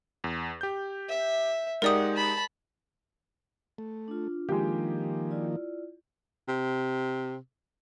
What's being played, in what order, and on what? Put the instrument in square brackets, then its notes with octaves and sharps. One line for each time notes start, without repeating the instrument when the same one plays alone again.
[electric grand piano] E2
G4 G6
[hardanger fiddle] E5
[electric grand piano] G#3 D#4 G4 [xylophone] A#4 D5 D#6 [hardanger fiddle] F#5
[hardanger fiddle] A5 B5
[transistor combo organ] A3
[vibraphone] D4 F4
[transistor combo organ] D#3 F3 A#3 [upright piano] G#3 G4
[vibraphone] E4 F4 D5
[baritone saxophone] C3